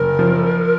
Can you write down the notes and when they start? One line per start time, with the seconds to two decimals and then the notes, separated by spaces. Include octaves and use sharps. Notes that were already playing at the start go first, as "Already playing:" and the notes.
Already playing: F#1 A#4
0.19 F3